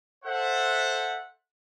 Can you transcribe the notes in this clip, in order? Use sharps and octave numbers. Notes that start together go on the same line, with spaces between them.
A4 C5 E5 F#5